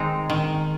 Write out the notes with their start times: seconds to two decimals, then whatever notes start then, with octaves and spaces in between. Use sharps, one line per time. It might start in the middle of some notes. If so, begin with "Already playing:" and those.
Already playing: D#3 G#3 C4 D#4
0.30 D#3